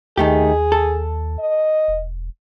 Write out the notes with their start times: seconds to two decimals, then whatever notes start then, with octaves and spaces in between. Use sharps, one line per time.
0.18 D#2 D#3 A3 G4 G#4
0.72 A4
1.39 D#5
1.88 E1